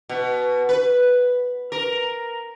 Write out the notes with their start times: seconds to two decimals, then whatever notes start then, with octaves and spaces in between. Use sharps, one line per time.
0.09 B2
0.69 B4
1.72 A#4